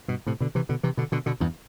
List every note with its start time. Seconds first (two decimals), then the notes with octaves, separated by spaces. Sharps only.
0.08 G2 B2
0.27 A2 C3
0.40 B2 D3
0.55 C3 E3
0.69 B2 D3
0.83 C3 E3
0.97 B2 D3
1.12 B2 D3
1.26 B2 D3
1.40 E2 G2